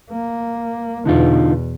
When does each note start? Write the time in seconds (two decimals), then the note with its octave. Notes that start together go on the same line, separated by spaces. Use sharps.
0.11 A#3
1.05 E2 B2 D3 D#4 F4